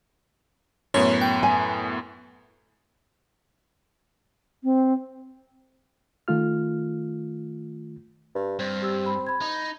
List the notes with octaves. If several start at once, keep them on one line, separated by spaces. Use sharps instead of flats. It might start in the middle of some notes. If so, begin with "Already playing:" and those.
F#2 A2 B3 C#5
G5
G#5
C4
D#3 A3 F4 F6
G2
G2 C4
G4 E6
B5
B5 G#6
D#4